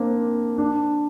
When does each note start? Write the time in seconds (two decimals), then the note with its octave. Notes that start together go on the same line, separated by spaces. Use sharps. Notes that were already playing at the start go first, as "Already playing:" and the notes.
Already playing: A#3 C4 D4
0.58 D4